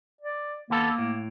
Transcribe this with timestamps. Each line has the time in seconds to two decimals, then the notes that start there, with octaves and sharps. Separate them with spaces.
0.21 D5
0.70 D#2 A#3 B3 A4
0.98 A2